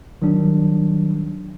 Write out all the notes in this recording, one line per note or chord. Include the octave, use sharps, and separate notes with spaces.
D#3 F#3 G3 D4